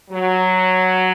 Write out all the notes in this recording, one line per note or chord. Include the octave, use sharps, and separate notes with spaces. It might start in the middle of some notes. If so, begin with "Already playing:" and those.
F#3